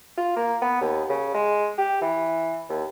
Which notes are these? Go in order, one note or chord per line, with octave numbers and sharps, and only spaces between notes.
F4
A#3
B3
D#2
C#3
G#3
G4
E3
D#2